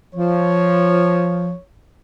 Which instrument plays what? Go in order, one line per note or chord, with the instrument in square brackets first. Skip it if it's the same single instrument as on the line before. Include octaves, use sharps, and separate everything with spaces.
[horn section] F3 [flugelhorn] C#5